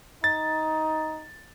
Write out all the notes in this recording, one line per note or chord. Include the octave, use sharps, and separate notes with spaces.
D#4 A6